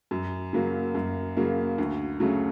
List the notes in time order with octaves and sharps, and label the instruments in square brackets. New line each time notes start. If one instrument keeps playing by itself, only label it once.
[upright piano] F#2
C#3 F#3 A#3
F#2
C#3 F#3 A#3
D2
C#3 F#3 A3 C#4